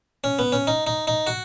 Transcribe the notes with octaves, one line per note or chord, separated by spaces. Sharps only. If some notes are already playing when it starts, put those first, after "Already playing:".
C#4
B3
C#4
D#4
D#4
D#4
F#4